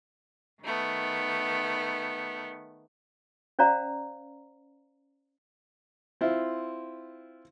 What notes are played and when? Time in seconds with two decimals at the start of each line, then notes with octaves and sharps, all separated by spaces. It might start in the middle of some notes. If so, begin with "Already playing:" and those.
0.62 D#3 A3 B3
3.59 C#4 C5 D5 F5 A#5
6.21 C4 E4 F4